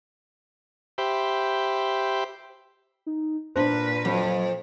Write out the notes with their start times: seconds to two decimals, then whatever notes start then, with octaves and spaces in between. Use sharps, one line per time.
0.98 G4 C5 E5 B5
3.06 D#4
3.56 A#2 D4 B4 C5 F#6
4.05 F2 F#3